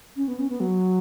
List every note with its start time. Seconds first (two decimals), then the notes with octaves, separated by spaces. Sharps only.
0.17 C#4
0.28 B3
0.39 C#4
0.49 B3
0.60 F#3